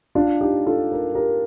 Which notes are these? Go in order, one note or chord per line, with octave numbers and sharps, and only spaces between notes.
D4 F4
D#4 G4
F4 A4
A#4
G4 A#4